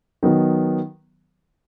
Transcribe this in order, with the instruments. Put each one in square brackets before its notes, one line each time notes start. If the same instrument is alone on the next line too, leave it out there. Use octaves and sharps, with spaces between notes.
[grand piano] D#3 F#3 B3